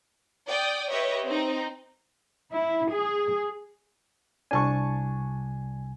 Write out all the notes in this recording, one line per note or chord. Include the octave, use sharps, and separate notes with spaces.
D5 G5 D#6
G4 B4 C#5 D#5 E5
C4 D#4
E4
G#4
C2 D4 G#5 A5 C#6